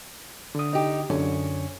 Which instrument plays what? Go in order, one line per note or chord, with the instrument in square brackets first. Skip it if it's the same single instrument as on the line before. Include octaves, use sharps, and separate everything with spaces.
[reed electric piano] D3 D#6
[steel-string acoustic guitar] D#4 G4
[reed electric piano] F#2 D3 [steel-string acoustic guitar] C#4